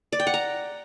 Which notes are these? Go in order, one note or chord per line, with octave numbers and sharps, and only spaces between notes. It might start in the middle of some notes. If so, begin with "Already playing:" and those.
D5
G5
F#5
A#5